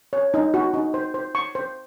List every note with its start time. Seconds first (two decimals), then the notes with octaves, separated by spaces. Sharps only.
0.13 C#5
0.34 D#4
0.54 F#4
0.74 D#4
0.94 C5
1.14 C5
1.35 C#6
1.55 C5